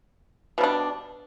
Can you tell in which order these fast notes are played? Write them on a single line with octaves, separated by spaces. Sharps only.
B2 G3 D4